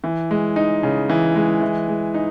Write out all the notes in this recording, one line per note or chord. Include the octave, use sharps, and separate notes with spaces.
E3
G#3
D#4
C#3
E3
G#3
E3
G#3
D#4